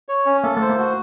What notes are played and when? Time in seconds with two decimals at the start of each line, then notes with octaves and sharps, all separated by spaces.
0.09 C#5
0.26 C#4
0.44 A#3 A4
0.57 A3 C5
0.69 A#3
0.78 F#4